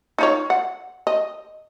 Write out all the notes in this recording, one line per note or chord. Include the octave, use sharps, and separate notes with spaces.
D#4 F4 C#5
F#5
D#5